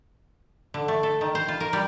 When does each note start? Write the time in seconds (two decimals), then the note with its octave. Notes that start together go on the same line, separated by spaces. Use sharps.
0.74 D3
0.88 A3
1.03 A4
1.21 D#3
1.35 C5
1.48 F4
1.60 A#4
1.73 G3